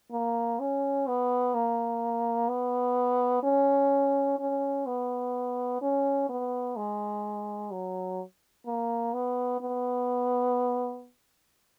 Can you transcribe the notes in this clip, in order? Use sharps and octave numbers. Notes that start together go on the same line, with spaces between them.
A#3
C#4
B3
A#3
B3
C#4
C#4
B3
C#4
B3
G#3
F#3
A#3
B3
B3